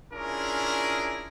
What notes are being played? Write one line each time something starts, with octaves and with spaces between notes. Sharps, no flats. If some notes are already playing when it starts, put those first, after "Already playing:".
C#4 D4 E4 F4 G#4 A#4